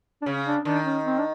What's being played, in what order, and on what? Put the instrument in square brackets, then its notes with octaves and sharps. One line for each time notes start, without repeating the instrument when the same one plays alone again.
[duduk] D4
[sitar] C#3 [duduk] C#4
[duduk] D4
[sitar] D#3 [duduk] D4
[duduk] C#4
C4
D4